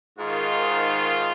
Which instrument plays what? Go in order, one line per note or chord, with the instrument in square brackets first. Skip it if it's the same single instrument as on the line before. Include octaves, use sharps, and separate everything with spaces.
[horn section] G#2 D#3 F4